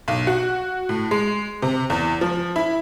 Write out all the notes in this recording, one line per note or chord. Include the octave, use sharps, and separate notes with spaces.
B1
F#4
A2
G#3
C3
E2
F3
E4